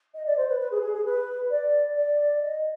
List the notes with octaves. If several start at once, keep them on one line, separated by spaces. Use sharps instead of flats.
D#5
D5
C5
B4
B4
G#4
G#4
G#4
B4
D5
D5
D#5